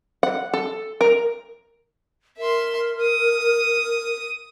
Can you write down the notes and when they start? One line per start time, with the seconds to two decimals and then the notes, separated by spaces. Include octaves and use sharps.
0.23 F#5
0.54 A4
1.01 A#4
2.38 A#4 E5 C6
3.01 D#6